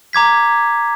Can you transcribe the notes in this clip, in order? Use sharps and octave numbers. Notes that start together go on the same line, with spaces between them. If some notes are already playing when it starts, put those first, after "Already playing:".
A#5 D6 G#6 B6